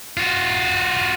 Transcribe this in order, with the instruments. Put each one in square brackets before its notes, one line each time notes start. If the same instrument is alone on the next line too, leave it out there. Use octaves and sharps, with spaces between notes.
[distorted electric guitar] F4 F#4